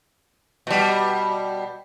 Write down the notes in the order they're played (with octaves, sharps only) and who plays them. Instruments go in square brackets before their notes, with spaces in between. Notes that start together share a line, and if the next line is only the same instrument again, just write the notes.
[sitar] B2 G3